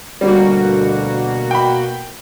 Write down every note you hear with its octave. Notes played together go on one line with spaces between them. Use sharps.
D2 B2 G3 A#3 F#4
G5 B5